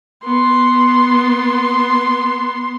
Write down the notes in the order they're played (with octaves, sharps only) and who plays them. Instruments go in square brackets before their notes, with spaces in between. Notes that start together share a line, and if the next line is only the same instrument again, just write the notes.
[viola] B3 C6